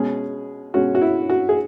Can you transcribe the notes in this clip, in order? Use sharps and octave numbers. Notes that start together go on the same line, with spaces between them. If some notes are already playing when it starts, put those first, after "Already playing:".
Already playing: B2 G#3 C#4 G#4
B2 G#3 C#4 F#4
F#4
E4
F#4
G#4